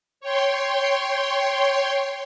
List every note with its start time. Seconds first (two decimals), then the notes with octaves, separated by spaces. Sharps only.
0.21 C#5 G5 C6